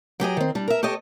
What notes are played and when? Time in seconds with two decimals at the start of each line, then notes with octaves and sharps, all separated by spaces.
0.20 F#3 G4 G#4 D#5
0.37 D#3 C4
0.55 G3 D4
0.68 A#4 E5
0.83 G4 A4 C#5 D#5